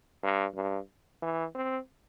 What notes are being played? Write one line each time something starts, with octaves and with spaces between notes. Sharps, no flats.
G2
G2
E3
C4